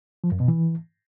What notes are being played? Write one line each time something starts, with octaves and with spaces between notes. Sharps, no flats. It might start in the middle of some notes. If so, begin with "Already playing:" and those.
F3
F#2
B2
E3